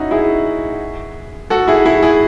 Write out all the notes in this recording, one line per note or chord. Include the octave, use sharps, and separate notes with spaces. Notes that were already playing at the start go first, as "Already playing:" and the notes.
Already playing: C#4 D#4 E4 F#4
E4 G#4
F#4 A4
E4 G#4
E4 G#4
E4 G#4